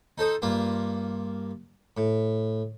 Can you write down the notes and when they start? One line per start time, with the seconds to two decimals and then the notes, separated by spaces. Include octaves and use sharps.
0.18 D#4 A4 C5 D#6
0.42 G2 A#3 F4
1.97 A2